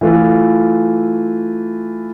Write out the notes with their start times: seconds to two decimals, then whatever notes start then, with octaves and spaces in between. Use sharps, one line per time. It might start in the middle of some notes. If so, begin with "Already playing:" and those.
0.01 E3 A3 F4